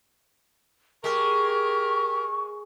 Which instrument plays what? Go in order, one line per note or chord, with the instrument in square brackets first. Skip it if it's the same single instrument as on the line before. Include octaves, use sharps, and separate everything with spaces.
[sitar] G#3 [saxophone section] G4 A#4 [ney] C#6